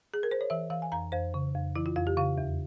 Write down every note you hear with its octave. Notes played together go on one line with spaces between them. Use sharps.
G#4
A#4
C5
C#5
E3 E5
E3 F5
G#5
F2 A#5
F2 C5
C#3
F2
E3 E4
F4
F2 F4
G4
C#3 F5
E2